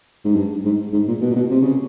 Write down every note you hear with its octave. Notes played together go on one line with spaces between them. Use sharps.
G#2
G2
G#2
G#2
A#2
B2
A#2
B2
C3
C#3